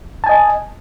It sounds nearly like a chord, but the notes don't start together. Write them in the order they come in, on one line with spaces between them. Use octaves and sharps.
A5 G#5 D#5